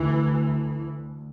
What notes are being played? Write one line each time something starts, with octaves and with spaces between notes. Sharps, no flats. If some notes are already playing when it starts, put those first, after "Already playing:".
Already playing: D2 E3